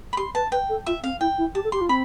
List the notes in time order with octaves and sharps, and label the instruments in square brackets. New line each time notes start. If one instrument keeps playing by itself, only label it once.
[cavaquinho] B5
[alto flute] G4 [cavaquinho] C6
[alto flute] B4 [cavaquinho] A5
[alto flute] B4 [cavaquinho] G5
[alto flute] A4
[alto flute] F4 [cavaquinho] E5
[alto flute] C4 [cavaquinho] F5
[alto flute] E4 [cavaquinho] G5
[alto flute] E4
[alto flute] G4 [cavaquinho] A5
[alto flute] A4
[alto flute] G4 [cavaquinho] C6
[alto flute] F4
[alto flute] C4 [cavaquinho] B5